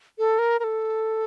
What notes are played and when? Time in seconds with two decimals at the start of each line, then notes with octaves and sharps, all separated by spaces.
0.18 A4
0.39 A#4
0.60 A#4
0.64 A4